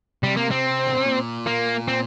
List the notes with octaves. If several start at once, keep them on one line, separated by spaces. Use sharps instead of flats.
C3 G3
A#3
C4
D3
C3
A#2
A#3
C4